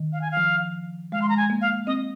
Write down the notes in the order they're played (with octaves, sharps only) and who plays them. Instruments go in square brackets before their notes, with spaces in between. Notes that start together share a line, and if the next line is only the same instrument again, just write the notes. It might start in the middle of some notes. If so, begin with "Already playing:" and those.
Already playing: [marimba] D#3
[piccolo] F5
G#5
F5
[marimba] F3
[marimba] G#3 [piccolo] F5
[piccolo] C6
A#5
G#5
[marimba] A#3
[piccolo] F5
[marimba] C4 [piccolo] D#5